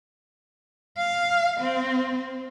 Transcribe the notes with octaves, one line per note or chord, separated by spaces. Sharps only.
F5
C4